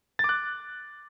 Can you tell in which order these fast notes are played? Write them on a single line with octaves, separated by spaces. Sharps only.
A6 D6 F#6